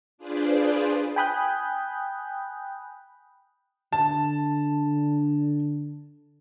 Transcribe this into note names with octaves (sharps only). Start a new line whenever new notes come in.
D4 F4 G#4 B4 C5 D5
G5 G#5 B5 D#6 F#6 G6
D3 A5